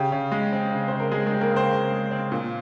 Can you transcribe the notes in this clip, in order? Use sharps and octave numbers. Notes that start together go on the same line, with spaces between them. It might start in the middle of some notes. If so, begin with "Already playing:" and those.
Already playing: C#3 G4
C#3
G#3
C4
C#3
C#3 C5
A#4
G#3 G#4
G#3 G#4
C4
A#3 A#4
C#3 C4 C5
C#3
G#3
C4
A#2